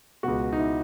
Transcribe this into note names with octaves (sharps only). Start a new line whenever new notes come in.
C#2 B2 F#4
D#4
E4